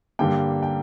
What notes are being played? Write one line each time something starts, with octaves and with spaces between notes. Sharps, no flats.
G2 D3 G3 A#3 G5
G5